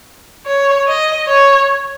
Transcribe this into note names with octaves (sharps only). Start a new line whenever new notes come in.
C#5
D#5
C#5